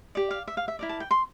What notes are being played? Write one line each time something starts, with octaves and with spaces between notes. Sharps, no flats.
G4 D5
F5
E5
F5
E5
E4 A#4 D5
A5
G5
C6